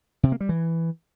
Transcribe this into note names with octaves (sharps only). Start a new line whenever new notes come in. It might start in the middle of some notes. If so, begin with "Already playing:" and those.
C3
A#3
G3
E3